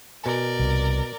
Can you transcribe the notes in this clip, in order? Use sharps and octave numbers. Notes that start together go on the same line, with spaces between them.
B2 A#4 D5 G#5
C2